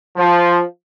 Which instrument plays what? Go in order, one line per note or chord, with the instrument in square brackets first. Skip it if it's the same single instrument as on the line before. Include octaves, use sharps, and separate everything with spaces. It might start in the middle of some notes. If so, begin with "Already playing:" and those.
[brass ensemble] F3